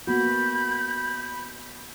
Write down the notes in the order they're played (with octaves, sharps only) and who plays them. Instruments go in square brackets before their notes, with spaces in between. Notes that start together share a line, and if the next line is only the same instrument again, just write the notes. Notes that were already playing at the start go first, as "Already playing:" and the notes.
[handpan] A#3 B3 F#4 [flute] B5 [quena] G6